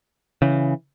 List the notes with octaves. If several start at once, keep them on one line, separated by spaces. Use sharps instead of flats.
C#3 E3